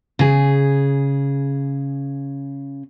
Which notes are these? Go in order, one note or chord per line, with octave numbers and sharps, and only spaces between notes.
C#3 G#4